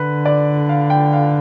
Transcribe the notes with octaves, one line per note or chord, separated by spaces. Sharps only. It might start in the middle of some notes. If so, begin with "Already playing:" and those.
Already playing: D3 B4
D5
F5
G5
F5